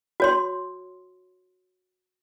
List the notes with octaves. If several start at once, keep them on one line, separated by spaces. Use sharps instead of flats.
F#4 C#5 C6